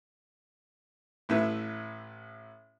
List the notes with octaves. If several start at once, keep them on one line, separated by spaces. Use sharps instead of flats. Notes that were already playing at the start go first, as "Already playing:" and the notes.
A1 A2 B4 E5